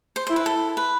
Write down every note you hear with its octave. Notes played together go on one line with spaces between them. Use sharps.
C5
E4 C5
B4
A4
B4